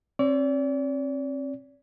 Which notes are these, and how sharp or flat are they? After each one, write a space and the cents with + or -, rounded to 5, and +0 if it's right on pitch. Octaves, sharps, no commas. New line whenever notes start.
C4 +40 D5 -40